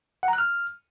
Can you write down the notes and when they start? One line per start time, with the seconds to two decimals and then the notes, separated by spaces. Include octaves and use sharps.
0.23 F#5
0.28 A#5
0.33 F#6
0.38 F6